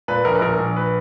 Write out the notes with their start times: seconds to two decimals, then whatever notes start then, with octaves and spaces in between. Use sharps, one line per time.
0.08 A#2 B4
0.25 A#1 A#4
0.35 B4
0.41 A#1 A#4
0.59 A#1
0.76 B4